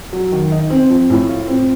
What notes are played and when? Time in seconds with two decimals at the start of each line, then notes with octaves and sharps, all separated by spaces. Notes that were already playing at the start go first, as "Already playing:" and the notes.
0.13 F#3
0.32 D#3
0.52 D#4
0.70 C4
0.90 F3
1.10 A2
1.29 F4
1.48 C4